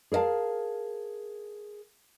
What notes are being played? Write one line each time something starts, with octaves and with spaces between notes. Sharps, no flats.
G#4 A#4 D5 F5 A5